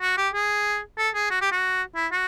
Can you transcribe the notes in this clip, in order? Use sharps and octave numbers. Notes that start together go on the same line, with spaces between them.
F#4
G4
G#4
A4
G#4
F#4
G4
F#4
E4
F#4